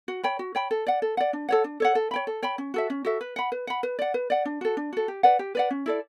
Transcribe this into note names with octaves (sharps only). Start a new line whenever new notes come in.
F#4
C#5 G5 B5
F#4
C#5 G5 B5
A4
D5 F#5
A4
D5 F#5
D4
A4 C#5 F#5
D4
A4 C#5 F#5
A4
C#5 G5 B5
A4
C#5 G5 B5
C#4
F#4 A4 E5
C#4
F#4 A4 E5
B4
F#5 B5
B4
F#5 B5
B4
D5 F#5
B4
D5 F#5
D4
F#4 A4
D4
F#4 A4
G4
B4 D5 F#5
G4
B4 D5 F#5
C#4
E4 A4 D5